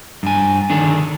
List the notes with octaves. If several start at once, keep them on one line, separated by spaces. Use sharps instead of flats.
G2 G#5
D3 D#3 D4 G#4